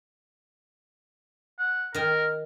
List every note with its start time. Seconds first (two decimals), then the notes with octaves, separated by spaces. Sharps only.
1.59 F#5
1.94 D#3 A#4 D#5